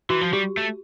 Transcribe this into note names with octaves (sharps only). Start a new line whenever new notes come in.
E3 F#4
F3
G3 G4
A3